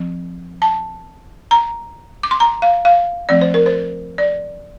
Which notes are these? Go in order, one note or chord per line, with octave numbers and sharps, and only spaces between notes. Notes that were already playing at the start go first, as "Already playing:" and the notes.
Already playing: F3 C4
A5
A#5
D6
C6
A#5
F5
F5
F3 A3 C4 D5
C5
A#4
C5
D5